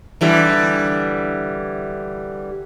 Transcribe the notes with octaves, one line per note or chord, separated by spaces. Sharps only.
D3 E3 G3